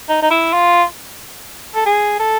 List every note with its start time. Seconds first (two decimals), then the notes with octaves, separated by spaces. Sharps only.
0.09 D#4
0.22 D#4
0.31 E4
0.53 F4
1.75 A4
1.86 G#4
2.19 A4